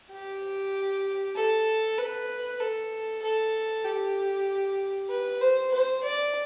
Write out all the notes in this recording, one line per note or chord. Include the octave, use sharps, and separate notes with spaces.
G4
A4
B4
A4
A4
G4
B4
C5
C5
D5